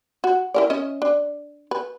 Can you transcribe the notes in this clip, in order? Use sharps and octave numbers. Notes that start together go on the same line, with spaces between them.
F#4
E4 A#4 D5
C#4 D#5 E5
D4
B4